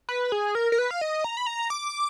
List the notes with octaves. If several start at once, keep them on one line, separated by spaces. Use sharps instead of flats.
B4
G#4
A#4
A#4
B4
F5
D#5
A#5
B5
A#5
D6